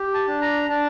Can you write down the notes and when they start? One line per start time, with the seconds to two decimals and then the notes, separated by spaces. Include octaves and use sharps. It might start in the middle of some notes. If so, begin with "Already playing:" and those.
Already playing: G4
0.14 A5
0.28 D4
0.42 A#5
0.69 D4 A5